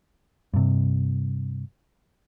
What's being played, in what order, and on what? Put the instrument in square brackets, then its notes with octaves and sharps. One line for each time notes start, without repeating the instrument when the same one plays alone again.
[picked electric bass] G2 C3